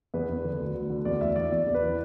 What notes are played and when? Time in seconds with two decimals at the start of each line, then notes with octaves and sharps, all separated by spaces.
0.14 E2 B4
0.29 E2
0.44 D3
0.60 D2
0.75 D2
0.90 D3
1.05 E2 D5
1.21 E2 E5
1.36 E3 D5
1.52 E2 D5
1.67 E2
1.75 B4
1.82 E3